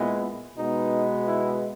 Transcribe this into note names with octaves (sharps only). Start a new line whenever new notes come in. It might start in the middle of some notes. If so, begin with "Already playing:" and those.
Already playing: A#2 G#3 B3 E4
B2 G#3 B3 D#4
E4